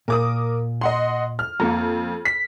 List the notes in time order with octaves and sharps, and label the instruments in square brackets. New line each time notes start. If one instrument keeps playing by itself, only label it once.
[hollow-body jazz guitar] A#2 [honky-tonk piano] A#4 D6 D#6
[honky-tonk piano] D#5 F#5 C6
F6
[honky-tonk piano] F2 [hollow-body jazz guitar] A#3 A4 A#5
[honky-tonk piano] B6